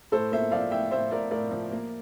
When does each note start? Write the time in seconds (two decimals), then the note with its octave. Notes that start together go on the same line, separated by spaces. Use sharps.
0.12 A2 A4 C5
0.32 A#3 C5 E5
0.52 F3 D5 F5
0.71 A2 E5 G5
0.91 A2 C5 E5
1.11 A2 A#4 D5
1.31 A2 A#4 D5
1.51 F3
1.72 A#3